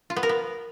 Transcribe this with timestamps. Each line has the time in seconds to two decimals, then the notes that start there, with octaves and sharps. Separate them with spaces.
0.10 F4
0.16 B3
0.23 A#4
0.29 B3